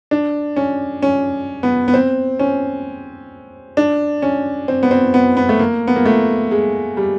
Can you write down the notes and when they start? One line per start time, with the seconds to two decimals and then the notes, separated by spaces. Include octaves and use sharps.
0.11 D4
0.56 C#4
1.02 C#4
1.63 B3
1.88 B3
1.94 C4
2.39 C#4
3.77 D4
4.22 C#4
4.68 C4
4.83 B3
4.91 C4
5.14 B3
5.37 B3
5.49 A3
5.59 A#3
5.87 B3
5.96 A#3
6.05 A3
6.51 G#3
6.97 G3